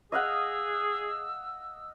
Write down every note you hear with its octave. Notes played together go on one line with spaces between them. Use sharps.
G#4 D#5 F5 F#5 E6